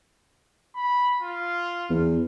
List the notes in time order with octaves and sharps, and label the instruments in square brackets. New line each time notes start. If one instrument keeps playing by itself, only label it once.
[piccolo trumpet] B5
F4
[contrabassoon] E2